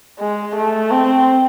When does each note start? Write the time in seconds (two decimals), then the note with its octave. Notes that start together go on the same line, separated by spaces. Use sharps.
0.19 G#3
0.56 A3
0.91 C4